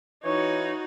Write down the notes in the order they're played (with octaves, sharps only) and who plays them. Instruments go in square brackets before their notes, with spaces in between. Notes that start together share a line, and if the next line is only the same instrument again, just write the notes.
[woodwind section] E3 C#5 [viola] D#4 F#4